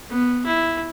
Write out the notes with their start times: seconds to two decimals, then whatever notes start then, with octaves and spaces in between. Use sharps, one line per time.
0.10 B3
0.46 E4